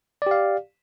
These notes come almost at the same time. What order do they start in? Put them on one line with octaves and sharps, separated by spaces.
D5 G4 F5